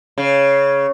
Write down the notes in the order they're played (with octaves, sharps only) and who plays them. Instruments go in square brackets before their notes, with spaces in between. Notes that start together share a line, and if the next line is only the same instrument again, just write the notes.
[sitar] C#3